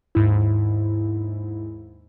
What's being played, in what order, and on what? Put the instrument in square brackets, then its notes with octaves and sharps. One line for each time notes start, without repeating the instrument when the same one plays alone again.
[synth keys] D#2 G#2 E4